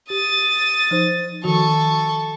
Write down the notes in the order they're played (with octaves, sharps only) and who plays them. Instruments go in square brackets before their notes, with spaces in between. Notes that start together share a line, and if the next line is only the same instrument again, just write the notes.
[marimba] G4 [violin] D#6 A6
[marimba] F3 D#4 C5
[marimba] D#3 F3 F#4 [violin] A4 C#6